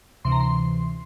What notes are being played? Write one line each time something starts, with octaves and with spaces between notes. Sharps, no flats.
D2 C3 E3 C6
A#5
C6